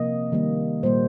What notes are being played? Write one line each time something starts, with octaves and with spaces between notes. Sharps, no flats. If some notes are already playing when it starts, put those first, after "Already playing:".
Already playing: C3 F3 A#3 D#5
D#3 G3 A#3
A#2 G3 A#3 C5